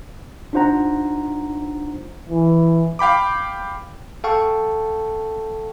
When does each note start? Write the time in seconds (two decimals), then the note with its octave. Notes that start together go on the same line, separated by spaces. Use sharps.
0.53 D4 D#4 F4 C5 F#5 A#5
2.29 E3
2.99 F5 G5 B5 D6
4.24 A4 F5 G5 A5 C#6